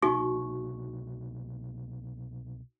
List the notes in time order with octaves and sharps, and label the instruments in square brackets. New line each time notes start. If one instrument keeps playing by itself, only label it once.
[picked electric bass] C2 B2 A#3 [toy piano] D#4 F#4 C#6